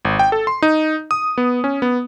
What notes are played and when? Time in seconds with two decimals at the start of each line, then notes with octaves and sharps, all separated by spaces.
0.05 G#1
0.19 G5
0.32 A4
0.47 C6
0.62 D#4
1.11 D#6
1.38 B3
1.64 C#4
1.82 B3